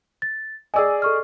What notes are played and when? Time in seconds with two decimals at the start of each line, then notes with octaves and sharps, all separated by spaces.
0.22 A6
0.74 G#4 D5 D#5 G#5 E6
1.02 A4 C#6 F6